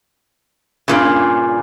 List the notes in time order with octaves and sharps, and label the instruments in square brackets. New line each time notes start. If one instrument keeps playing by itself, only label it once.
[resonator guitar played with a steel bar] G2 A#2 C#3